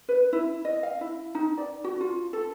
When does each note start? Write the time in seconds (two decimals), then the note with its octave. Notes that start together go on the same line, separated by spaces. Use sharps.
0.09 B4
0.33 E4
0.65 D#5
0.83 F5
1.01 E4
1.35 D#4
1.58 D5
1.84 F#4
2.00 F4
2.33 A4